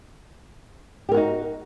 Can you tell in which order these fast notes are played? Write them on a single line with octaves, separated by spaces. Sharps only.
G4 A#4 F#4 D#4